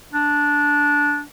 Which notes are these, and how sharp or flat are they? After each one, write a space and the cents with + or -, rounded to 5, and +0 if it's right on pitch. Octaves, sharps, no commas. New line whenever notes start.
D4 -10